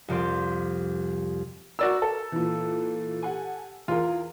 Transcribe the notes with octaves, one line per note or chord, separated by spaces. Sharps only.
C2 F2 D5 C6
F#4 A#4 D5 E6
A4
A#2 E3
G4 F#5 G#5
E2 F4 G#4 A#4